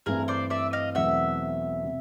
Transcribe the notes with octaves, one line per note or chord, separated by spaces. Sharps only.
G2 E3 A3 C4 E4 G#4 A#4
C5 D5
D5 E5
D#5 F5
E2 B2 F#3 A3 C4 E5 F#5
C3